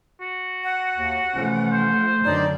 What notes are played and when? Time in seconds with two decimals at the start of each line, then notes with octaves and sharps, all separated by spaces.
0.21 F#4
0.64 F#5
0.96 D#2
1.34 C3 E3 F3 A3 C#4
1.72 C5
2.25 F#2 D3 D#3 D4 D#4 D5